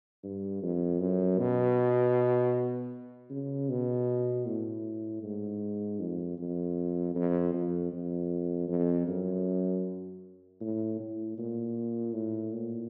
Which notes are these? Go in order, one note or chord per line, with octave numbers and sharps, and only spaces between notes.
G2
F2
F#2
B2
C#3
B2
A2
G#2
F2
F2
F2
F2
F2
F2
F#2
A2
A2
A#2
A2
A#2